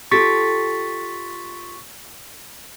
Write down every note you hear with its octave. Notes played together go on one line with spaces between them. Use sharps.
F4 G4 A4 C#6 A6 B6